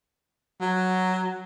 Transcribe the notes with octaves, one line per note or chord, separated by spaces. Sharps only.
F#3